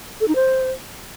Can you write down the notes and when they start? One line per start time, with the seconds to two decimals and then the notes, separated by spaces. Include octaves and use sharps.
0.21 A4
0.28 D#4
0.35 C5